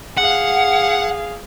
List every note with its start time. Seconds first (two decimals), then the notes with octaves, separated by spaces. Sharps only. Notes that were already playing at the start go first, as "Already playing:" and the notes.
0.17 G#4 F5 F#5